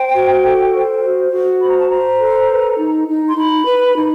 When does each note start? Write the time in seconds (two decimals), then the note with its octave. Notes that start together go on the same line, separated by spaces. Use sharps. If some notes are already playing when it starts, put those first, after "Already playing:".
Already playing: C5 G5
0.15 F#4
0.44 A4
0.74 C5
1.03 F#4
1.33 F#4
1.61 C5 B5
1.70 A#5
1.79 A5
1.88 C5 A#5
2.20 A4
2.50 B4
2.78 D#4
3.08 D#4
3.29 C6
3.36 D#4 B5
3.66 B4
3.96 D#4